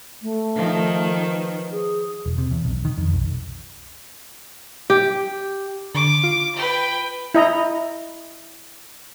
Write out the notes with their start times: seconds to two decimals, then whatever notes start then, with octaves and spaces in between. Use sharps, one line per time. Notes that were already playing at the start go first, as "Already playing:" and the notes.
0.22 A3
0.55 D#3 F3
1.31 B4
1.71 G#4
2.26 E1
2.38 C3
2.51 E2
2.65 B1
2.85 D#3
2.97 F2
3.13 B1
4.90 G4
5.95 D3 D6
6.24 F4
6.56 B4 G5
7.34 E4 D#5 A#5